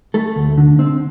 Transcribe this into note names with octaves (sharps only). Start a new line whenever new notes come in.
A3 A4
D2
D3
D3 C4